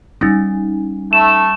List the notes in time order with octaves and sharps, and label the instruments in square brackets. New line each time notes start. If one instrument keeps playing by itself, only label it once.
[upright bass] G3 [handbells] C#4 D#4
[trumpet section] A3 [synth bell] E7